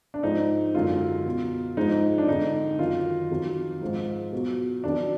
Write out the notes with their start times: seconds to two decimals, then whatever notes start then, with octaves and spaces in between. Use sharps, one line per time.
0.14 D4
0.23 G#2 F3 G#3 D#4
0.74 F#2 D3 G#3 F4
1.26 B2 F#3
1.77 G#2 F3 G#3 D#4
2.18 D4
2.28 F2 D3 G#3 D#4
2.79 F#2 D#3 F#3 F4
3.31 F2 D#3 F#3
3.81 G#2 F3 G#3
4.33 B2 F#3
4.84 F2 D#3 F#3 D4